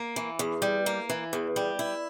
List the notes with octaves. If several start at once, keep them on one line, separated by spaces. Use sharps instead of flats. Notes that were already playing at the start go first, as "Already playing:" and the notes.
Already playing: A#3
E3
E2
G3
A#3
E3
E2
G3
E4